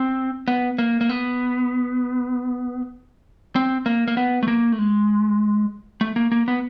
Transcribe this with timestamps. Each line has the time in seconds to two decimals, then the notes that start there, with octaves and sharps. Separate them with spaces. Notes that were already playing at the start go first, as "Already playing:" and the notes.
Already playing: C4
0.48 B3
0.78 A#3
1.01 A#3
1.09 B3
3.56 C4
3.86 A#3
4.08 A#3
4.17 B3
4.43 A3
4.48 A#3
4.72 A3
4.79 G#3
6.01 A3
6.16 A#3
6.32 A#3
6.48 B3